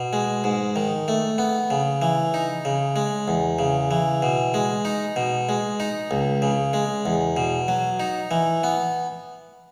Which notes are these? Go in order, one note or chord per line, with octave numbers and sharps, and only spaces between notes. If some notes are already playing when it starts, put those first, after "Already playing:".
Already playing: B2
G#3
G#2
D#3
A3
B3
C#3
E3
D#4
C#3
G#3
E2
C#3
E3
B2
G#3
D#4
B2
G#3
D#4
C#2
C#3
G#3
E2
B2
F#3
D#4
E3
B3